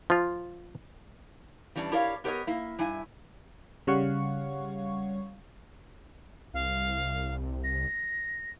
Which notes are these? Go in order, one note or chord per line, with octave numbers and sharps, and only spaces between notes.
F3 F4
E3 G3 C#4 D4
E4 G4 A#4 C#5 D5 F5
B3 G4 A#4 B4 C#5 D#5
A#3 E4
G2 E4 G#5
C#3 G3 C#5 F5 F#5 C#6
C2 F5
A#6